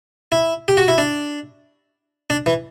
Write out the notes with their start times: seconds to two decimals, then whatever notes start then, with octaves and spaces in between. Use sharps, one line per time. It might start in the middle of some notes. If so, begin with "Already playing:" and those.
0.32 E4
0.68 G4
0.77 F#4
0.88 E4
0.98 D4
2.30 D4
2.46 E3